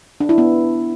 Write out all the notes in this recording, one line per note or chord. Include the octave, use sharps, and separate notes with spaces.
D4
E4
B3